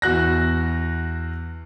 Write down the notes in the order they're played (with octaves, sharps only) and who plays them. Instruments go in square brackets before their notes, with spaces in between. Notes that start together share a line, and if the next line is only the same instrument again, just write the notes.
[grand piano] E2 F#4 F#6 A#6